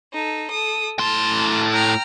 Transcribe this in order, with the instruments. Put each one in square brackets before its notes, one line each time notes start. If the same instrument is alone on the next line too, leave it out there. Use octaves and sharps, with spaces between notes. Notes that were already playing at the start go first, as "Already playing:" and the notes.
[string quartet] D#4 A4
A4 D#6
[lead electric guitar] A2 C6 [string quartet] A5 F6
[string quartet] G5 A#5 F6